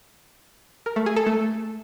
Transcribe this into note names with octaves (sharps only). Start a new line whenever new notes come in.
A#4
A3
G#4
A4
A3